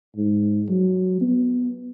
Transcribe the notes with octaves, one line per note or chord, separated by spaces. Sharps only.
G#2
F#3
B3